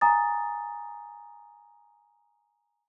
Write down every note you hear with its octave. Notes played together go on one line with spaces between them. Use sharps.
G#5 A#5 D#6 A6